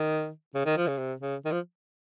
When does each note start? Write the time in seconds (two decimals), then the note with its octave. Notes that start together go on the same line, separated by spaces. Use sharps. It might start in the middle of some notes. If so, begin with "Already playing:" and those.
Already playing: D#3
0.55 C#3
0.66 D#3
0.77 F3
0.87 C#3
0.98 C3
1.20 C#3
1.45 D#3
1.52 F3